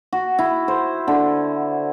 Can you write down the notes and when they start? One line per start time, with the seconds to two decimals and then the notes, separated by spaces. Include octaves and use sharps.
0.13 F#4
0.39 E4
0.68 C5
1.08 D3